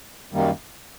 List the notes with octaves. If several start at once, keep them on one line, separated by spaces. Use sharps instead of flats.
F#2 D#3 G3 A#3